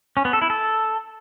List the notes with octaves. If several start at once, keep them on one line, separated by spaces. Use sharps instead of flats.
C#4
B3
A4
E4
A4